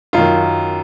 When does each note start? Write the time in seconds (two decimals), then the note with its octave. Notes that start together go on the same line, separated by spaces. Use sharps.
0.13 F#2 D#3 F4